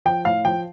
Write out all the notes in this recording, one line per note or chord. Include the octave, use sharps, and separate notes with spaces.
F3 G5
A2 F5
F3 G5